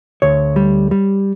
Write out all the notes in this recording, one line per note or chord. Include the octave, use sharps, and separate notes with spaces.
D2 C#5
G3
G3